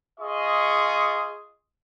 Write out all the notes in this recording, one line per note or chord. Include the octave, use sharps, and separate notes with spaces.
F4 G#4 D#5 C#6